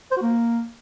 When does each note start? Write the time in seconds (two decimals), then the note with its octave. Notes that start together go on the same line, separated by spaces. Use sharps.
0.12 C5
0.17 F#4
0.22 A#3